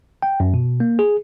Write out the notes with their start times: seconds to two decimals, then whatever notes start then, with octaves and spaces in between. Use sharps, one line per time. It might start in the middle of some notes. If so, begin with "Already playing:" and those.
0.22 G5
0.40 F#2
0.54 B2
0.80 A#3
0.99 G#4